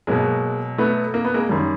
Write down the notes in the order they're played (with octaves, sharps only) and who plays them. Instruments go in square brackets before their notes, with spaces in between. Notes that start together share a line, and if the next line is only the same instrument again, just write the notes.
[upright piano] B2 F#3 G#3 A#3
A3 B3
A#3
B3
G#3 A#3
F#2 D#3 G3